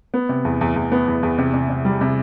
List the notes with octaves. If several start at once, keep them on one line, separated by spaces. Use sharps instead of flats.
B3
C3
E2
E2
E2
B3
E2
E2
C3
C3
C3
G3
C3